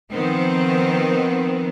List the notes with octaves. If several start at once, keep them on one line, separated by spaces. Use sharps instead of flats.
D#3 F3 B3 C4